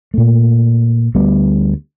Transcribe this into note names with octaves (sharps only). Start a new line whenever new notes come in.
A#2 A3
D2 G3 B3